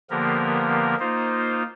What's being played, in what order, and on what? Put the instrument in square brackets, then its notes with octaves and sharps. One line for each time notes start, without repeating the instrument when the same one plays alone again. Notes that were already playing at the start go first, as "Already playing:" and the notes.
[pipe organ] D3 F3 A#3 B3 G4 A#4
A#3 D#4 F4 C5